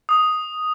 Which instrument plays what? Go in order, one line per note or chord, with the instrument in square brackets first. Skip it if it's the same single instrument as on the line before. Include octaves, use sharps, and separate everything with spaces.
[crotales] D#6